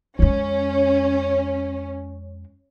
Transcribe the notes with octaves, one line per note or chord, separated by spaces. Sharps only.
F2 G#3 C#4